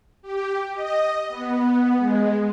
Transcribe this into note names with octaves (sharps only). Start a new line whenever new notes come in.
G4
D#5
B3
G#3